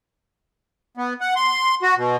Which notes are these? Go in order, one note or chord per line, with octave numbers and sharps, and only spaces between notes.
B3
F#5
C6
F#4
B2